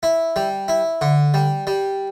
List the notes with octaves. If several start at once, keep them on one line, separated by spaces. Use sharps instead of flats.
E4
G3
E4
D3
G3
G3